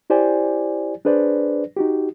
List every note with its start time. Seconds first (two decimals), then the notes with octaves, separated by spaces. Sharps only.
0.10 E4 G4 C5 D5 G#5
1.05 D4 G#4 B4 C5 D5
1.77 D#4 F#4 G4